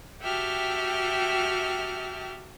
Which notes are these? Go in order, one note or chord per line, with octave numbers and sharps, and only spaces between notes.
F#4 G4 E5 G5 A5 F6